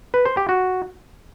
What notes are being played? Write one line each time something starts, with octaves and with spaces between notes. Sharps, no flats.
B4
C5
G4
F#4